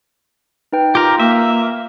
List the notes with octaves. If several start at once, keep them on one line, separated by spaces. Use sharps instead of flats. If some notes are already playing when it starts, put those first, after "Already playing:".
D#4 B4 G5
F4 G4 A#4
A#3 E5